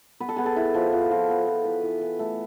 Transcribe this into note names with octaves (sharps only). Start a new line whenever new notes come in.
B3 B4
A4
B3 G#4
A4
E4
F3
F3
F3
B3
F3
E3 B4
E3
E3
A3